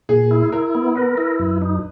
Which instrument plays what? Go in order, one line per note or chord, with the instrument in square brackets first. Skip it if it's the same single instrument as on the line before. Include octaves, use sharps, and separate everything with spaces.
[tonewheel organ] A#2 [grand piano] G#4
[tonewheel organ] E4
[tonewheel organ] E4 [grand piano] A#4
[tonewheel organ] B3
[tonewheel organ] A#4 [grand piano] B4
[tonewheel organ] E4
F#2
D#4